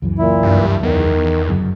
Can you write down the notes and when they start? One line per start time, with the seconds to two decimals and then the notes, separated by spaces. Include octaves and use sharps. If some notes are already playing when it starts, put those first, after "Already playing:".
0.02 C#2 F#2 E3
0.18 A#2 E4
0.43 G2
0.83 E2 D#3
1.47 G1 F#2 C#3